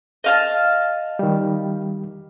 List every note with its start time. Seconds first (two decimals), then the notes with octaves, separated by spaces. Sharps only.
0.24 D#5 F5 A5
1.19 D#3 G3